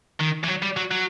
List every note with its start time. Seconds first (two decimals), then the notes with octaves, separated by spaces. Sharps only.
0.20 D#3
0.44 E3
0.48 F#3
0.62 G3
0.77 F#3
0.91 F#3